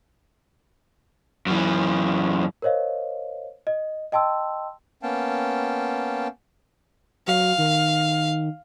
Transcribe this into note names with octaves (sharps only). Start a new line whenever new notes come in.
F#2 E3
A#4 C5 C#5 D#5 F5
D#5
D#5 G5 A5 C6 E6
A#3 B3 C#4 F5 G5 A5
F#3 F5
D#3